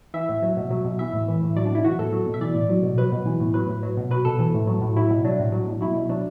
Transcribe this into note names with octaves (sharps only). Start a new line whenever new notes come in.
E3 E5
A2
F#3
B2
F#3
B2
E3 E5
A2
E3
A2
F#3 D5
D4
B2 E4
E3 F#4
A2 A4
F#3
B2
E5
E3 D5
A2
F#3
B2
F#3 B4
B2
E3
A2
F#3 B4
A2
F#3
B2
F#3 B4
B2 A4
E3
A2
F#3
A2
F#3 E4
B2
F#3 D4
A2
F#3
B2
F#3 E4
B2
F#3 D4